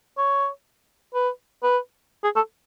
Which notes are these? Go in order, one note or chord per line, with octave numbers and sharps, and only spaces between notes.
C#5
B4
B4
G#4
A4